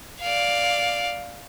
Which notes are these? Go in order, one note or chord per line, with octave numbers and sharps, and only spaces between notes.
D5 F5